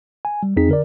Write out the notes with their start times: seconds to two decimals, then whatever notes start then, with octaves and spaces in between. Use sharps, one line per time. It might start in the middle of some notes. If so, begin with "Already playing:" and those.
0.25 G#5
0.43 G3
0.56 F2 C4 D#4 G#4 B6
0.69 D3 A#4 D5